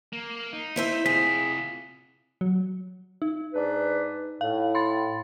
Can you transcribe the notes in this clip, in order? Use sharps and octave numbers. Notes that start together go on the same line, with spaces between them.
A#3
D#4
E4 C5 E5
C3 F4 G#4 B6
F#3
D#4
G#2 D4 B4
A2 F5
B5 C6 A6